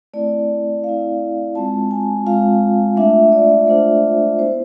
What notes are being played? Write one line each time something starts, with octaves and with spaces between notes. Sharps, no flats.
A3 C4 E4 D5
A3 C4 E4 F5
G#3 C4 F4 A5
G#5
G#3 C4 F4 F5
A3 D4 F4 E5
D5
A3 D4 F4 C5
B3 E4 C5